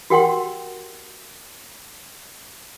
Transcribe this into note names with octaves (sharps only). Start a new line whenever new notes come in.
F#4 G4 A#4 F#5 G5 C6